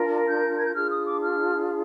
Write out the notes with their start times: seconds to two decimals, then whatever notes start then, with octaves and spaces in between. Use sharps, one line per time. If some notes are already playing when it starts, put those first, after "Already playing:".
Already playing: D4 F4 A#4
0.28 G6
0.57 G#6
0.66 G6
0.75 D4 F4 G#4 F6
0.91 D#6
1.07 D6
1.23 F6